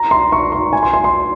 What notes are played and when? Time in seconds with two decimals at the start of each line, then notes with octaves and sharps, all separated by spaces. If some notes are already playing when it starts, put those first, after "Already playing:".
Already playing: A#5
0.11 C6
0.32 C#6
0.52 C6
0.73 G#5
0.83 C6
0.93 C6
1.04 C6